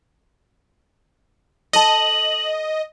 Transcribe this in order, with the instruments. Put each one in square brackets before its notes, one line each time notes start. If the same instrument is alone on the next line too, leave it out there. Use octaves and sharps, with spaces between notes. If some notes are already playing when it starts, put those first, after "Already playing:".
[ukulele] A4 A5 [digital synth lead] D#5 [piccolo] F#7